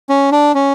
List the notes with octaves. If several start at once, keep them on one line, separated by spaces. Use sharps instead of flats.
C#4
D4
C#4